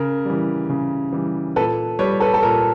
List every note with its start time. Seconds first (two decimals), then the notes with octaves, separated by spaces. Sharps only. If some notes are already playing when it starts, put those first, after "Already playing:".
Already playing: C#3 A#4
0.25 E3 G3
0.70 C#3
1.13 E3 G3
1.56 A#2 A4 B4
1.99 G3 B4 C#5
2.20 A4 B4
2.34 A4
2.42 A#2 A#4